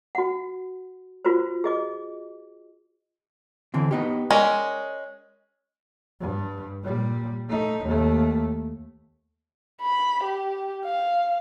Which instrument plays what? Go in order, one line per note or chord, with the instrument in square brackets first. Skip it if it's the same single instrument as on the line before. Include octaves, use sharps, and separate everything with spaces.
[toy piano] F#4 F#5
F4 F#4 B4 C5
G#4 D#5 D6
[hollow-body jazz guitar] D3 E3 C4
B3 D#4 G4
[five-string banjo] G#3 C#4 [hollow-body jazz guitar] A#4 D5
[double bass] G2
A#2 G3
A3 D#4
D#2 A3
[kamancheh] B5
G4
F5